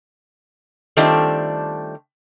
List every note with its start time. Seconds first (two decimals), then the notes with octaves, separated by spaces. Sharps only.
0.97 D#3 G3 A3 C4 D4 F4